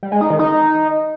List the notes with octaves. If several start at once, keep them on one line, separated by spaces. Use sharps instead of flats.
G3
G#3
D#4
D#3
D#4